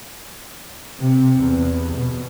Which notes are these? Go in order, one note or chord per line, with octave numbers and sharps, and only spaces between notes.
C3
E2
B2